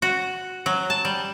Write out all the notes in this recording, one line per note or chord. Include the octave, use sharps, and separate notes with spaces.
F#4
F#3
A5
G3